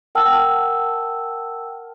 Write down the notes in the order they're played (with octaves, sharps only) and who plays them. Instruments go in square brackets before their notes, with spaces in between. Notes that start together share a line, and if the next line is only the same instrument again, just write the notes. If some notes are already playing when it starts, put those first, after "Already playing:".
[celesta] A#4 F#5 G5 A5 E6 F6